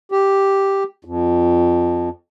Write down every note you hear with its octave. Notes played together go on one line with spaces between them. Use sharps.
G4
F2